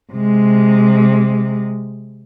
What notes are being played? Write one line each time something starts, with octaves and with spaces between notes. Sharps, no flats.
C3 G#3